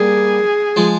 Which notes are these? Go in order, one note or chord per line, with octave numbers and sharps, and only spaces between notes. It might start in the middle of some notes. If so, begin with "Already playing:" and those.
Already playing: G3 A#3 G#4
F3 G#3